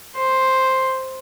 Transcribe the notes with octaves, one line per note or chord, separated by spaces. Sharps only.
C5